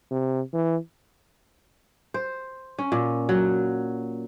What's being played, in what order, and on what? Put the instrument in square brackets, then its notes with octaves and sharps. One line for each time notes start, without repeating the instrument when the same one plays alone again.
[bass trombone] C3
E3
[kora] C5
C#4
A#2
F#3